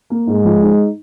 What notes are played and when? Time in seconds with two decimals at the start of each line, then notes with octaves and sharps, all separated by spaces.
0.10 A#3
0.27 G#2 G#3
0.45 F3
0.62 D#4